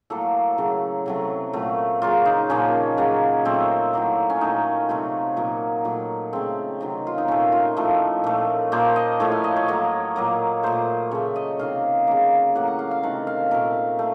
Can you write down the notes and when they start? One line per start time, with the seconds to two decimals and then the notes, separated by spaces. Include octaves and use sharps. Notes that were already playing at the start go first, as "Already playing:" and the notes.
0.10 A2 F#3 A#3 A4
0.58 C#3 F#3 A3
1.06 C3 F#3 A3
1.53 A#2 F#3 A3
2.02 C#3 F#3 A#3 F4
2.26 D#4
2.50 A#2 F3 A#3 C#4
2.98 C#3 F#3 A#3
3.45 A#2 F#3 A3 C4
3.93 A2 F#3 A#3
4.30 C#4
4.41 A#2 A3 D#4
4.89 C3 F#3 A3 F4
5.37 A#2 F#3 A#3
5.85 A#2 F#3 A3
6.33 C#3 A3 C4
6.81 C3 D#3 F#3
7.07 F4
7.18 D#4
7.28 A#2 A3 C#4
7.52 F4
7.77 A2 F3 A3
8.24 A#2 A3
8.72 A#2 F3 A#3 C5
8.96 D#5
9.20 A2 F3 A3 C#5
9.32 F5
9.44 D#5
9.56 C#5
9.68 A2 F#3 A#3
10.16 A#2 F#3 A#3
10.63 A#2 A3 C5
11.11 C#3 A3 C#5
11.36 D#5
11.59 C3 D#3 A#3 F5
12.07 C#3 F#3 A#3
12.55 A2 F#3 A#3 F#5
12.67 F#5
12.79 F5
12.91 F5
13.03 C3 D#3 A3 F#5
13.27 F5
13.51 A#2 A3 A#4
13.99 A3